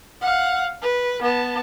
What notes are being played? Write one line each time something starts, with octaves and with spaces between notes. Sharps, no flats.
F5 F#5
B4
B3 A5